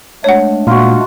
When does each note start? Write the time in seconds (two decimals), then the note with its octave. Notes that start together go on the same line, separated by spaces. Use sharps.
0.24 G#3 A3 D4 C#5 F#5
0.67 A#2 F4 F#4